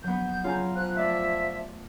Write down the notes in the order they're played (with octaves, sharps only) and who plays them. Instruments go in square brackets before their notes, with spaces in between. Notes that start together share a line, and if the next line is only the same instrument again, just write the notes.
[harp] F#3 B3 [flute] G6
[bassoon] C#3 [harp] F4 G#5 A#5
[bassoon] F3 [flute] F#6
[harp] A3 D5 [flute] E5